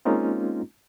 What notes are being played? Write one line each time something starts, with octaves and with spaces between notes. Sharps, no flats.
G#3 A#3 C4 C#4 D#4 F4